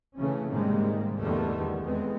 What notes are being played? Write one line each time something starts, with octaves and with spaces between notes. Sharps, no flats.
C#3 E3 A3 C#4
G#2 C3 D#3 G3 G#3 A#3
E2 D3 D#3 G3 A3 B3
E2 G#3 B3 C4